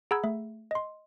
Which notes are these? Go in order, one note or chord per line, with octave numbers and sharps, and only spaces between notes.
G#4 F#5 A#5 B5 E6 G#6
A3 E5
D#5 C6